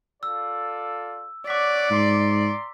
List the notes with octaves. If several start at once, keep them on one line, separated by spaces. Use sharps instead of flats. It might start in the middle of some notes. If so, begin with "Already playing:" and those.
F4 A4 D5 E6
C#5 D5 F#5 D6 B6
G#2 A#5 C6